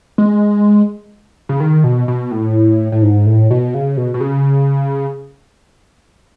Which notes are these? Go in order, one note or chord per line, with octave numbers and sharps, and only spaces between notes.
G#3
C#3
D#3
B2
B2
A2
A2
G#2
A2
B2
C#3
B2
B2
C#3